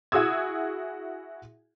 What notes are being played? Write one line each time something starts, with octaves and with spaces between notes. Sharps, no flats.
E4 F#4 G#4 D#6 E6 G#6